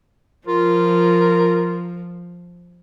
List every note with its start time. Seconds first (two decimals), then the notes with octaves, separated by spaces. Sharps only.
0.47 F3 F4 A#4